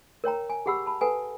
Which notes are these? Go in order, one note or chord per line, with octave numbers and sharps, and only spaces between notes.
A#4 C#5 G5 A#5
G#5
G4 G#4 F#5 B5 E6
A5 B5
A4 B4 F#5 G#5